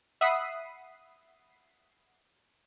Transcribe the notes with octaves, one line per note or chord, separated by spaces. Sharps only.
E5 F#5 B5 D#6 B6 C7